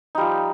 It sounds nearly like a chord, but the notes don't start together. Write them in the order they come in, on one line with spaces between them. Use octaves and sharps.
D#4 G3 F3